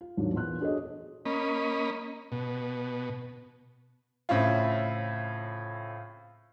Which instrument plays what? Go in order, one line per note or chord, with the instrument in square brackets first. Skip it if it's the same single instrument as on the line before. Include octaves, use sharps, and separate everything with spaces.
[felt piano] F4
D#2 G#2 F#3 D4
E2 A#2 B3 C6 F#6
D4 F#4 G#4 A4 C#5 D#5
[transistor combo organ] A#3 C#4 D#5 B5
B2
[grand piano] A2 C#3 C4 E4 F4